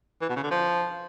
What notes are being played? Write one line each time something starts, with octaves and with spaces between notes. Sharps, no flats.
E3
B2
C#3
D3
F3